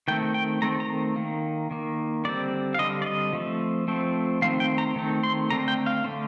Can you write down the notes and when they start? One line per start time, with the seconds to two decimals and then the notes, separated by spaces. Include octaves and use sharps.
0.08 D#3 A3 C4 G5
0.34 G5
0.62 D#3 A3 C4 A#5
0.80 A#5
1.16 D#3 A#3
1.71 D#3 A#3
2.25 D3 G3 C4 D5
2.74 F5
2.79 D3 G3 C4 D#5
3.02 D5
3.06 D#5
3.33 F3 A3 C4
3.88 F3 A3 C4
4.42 D#3 A3 C4 F5
4.60 G5
4.78 A#5
4.96 D#3 A3 C4
5.23 C6
5.50 D3 A3 C4 A#5
5.68 G5
5.86 F5
6.04 D3 A3 C4